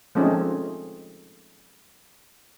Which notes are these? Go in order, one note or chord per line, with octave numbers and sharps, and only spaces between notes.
F3 G#3 A3 C4 C#4 D#4